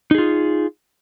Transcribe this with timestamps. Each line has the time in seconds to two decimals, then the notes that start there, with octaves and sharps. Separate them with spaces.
0.11 D#4
0.15 G#4
0.18 F4